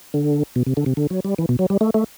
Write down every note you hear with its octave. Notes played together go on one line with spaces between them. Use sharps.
D3
B2
C3
D3
C3
D3
F#3
G3
E3
B2
F#3
G3
A3
A3